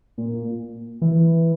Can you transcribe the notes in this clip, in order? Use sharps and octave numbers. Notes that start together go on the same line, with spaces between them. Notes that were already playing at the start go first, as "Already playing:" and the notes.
A#2
E3